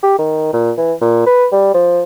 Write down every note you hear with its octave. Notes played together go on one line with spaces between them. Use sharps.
G4
D#3
A#2
E3
A#2
B4
G3
F3